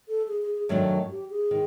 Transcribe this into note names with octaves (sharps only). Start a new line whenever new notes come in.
A4
G#4
G#4
G#4
F#2 D#3 F#3 A3 D4 F#4
G4
G#4
D#3